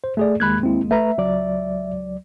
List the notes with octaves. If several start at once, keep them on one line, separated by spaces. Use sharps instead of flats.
C5
A3 G#4 D5
D#2 G#3 A#3 B5 F#6 G#6
C4 E4
A3 B4 E5 A#5
C#2 F#3 D5